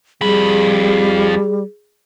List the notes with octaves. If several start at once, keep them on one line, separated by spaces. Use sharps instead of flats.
F2 G3 G#4 B5